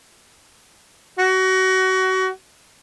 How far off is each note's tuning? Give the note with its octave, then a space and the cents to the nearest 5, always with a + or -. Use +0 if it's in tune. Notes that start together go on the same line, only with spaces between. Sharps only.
F#4 +25